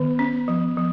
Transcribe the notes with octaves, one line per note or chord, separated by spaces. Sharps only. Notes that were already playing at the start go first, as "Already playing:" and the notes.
Already playing: D#3 B3
C#4
F3
F3